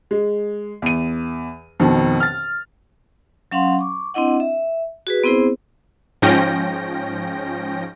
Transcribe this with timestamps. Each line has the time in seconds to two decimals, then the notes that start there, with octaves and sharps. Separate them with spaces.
0.11 G#3
0.82 E2 D#7
1.80 F2 B2 D#3
2.20 F6 A6
3.51 F#3 C#4 F5 F#5 C6
3.79 C#6 D6
4.14 C4 D4 E4 D#5 F#5
4.40 E5
5.07 F#4 G#4 B4
5.24 B3 C4 E4 G#4 C5
6.22 G#2 F3 C#4 G5 A#6